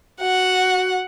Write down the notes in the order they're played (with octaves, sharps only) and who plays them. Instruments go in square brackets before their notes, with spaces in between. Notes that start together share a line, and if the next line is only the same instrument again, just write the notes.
[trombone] F#4 [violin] F#5